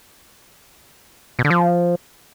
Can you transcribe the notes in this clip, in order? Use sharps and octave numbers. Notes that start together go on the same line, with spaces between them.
B2
D3
F3